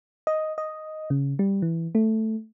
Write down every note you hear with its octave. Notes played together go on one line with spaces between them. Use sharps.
D#5
D#5
C#3
G3
E3
A3